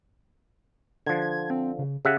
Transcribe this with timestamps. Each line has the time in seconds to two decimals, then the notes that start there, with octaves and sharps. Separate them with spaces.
1.06 D3 F3 G#6
1.50 C4
1.79 C#3
2.05 C#3 G4 E5 F#5